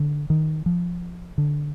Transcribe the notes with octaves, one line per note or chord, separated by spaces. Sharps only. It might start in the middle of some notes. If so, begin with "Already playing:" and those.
Already playing: D3
D#3
F3
D3